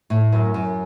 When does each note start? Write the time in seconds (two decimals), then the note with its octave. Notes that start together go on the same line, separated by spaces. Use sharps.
0.10 A2
0.32 F#2
0.54 F#2